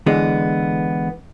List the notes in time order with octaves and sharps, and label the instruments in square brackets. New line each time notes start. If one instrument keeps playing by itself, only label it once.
[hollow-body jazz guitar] D3 E3 G#3 B3